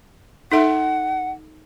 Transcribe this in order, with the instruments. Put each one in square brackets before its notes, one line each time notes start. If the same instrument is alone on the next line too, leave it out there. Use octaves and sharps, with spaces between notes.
[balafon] D#4 A4 E5 [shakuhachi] F#5